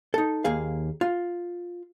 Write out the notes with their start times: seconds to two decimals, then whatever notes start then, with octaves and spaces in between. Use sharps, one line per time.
0.14 D#4 A4
0.44 D#2 A#3 G#4 F5
1.01 F4